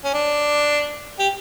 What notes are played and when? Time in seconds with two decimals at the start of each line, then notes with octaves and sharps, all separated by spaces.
0.04 C#4
0.14 D4
1.19 G4